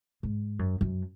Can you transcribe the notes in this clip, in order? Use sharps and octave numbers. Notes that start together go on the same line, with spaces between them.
G#2
F#2
F#2